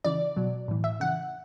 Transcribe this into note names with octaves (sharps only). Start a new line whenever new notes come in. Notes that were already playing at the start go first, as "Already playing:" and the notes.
C#3 E3 D5
B2 F#3
A2 E3
E5
C#3 E3 F#5